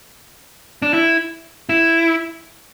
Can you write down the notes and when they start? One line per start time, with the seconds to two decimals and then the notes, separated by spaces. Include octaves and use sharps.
0.82 D4
0.93 E4
1.69 E4